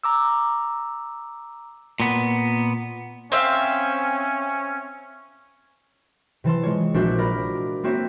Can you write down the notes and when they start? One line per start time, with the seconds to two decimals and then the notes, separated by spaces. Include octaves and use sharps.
0.04 A#5 D6 E6
2.00 A#2 B3
3.32 C4 C#4 E5 F5
6.44 C3 E3 A5 C6
6.63 G#3 F4 C#5
6.94 A#1 D4 F#4 C5 E5
7.19 A#4 D5 B5
7.84 A#3 C4 F#4 C#5 E5